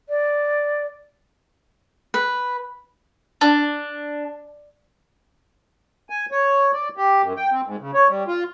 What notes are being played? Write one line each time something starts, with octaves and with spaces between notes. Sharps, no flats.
D5
B4
D4
G#5
C#5
D5
G4
F#2
G5
C4
G#2
C#3
C#5
G3
F4